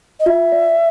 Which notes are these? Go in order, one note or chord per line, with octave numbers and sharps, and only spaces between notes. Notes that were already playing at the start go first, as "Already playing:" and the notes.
D#5
F4 E5
D5